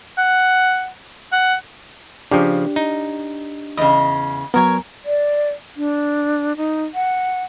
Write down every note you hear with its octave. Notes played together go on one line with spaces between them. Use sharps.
F#5
F#5
C#3 F3 D4 G4
D#4
E2 C#3 D#5
F#3 B3 A#4 C#5 G#5
D5
D4
D#4
F#5